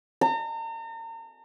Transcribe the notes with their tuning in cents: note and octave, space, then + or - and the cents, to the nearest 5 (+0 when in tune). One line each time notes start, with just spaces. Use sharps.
A#5 -40